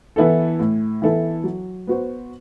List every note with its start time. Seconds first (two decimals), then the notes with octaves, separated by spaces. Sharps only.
0.16 E3 B3 E4 A4
0.60 A2
1.02 E3 B3 E4 A4
1.44 F#3
1.87 B3 F#4 C5